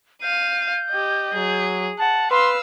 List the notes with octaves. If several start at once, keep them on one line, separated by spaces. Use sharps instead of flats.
F5 G6 D#7
G4 D#5
F#3 G#4
F#5 A5
B4 F5 C6 E6